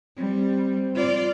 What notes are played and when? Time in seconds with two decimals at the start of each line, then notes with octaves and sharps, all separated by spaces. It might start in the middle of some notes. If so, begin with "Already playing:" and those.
0.17 G3 C4
0.96 F4 D5